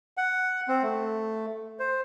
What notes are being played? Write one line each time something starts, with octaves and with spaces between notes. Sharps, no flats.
F#5
C4
A3
C5